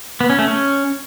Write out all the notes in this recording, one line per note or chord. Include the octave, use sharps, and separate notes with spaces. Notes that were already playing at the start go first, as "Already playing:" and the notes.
B3
C#4
A3
C#4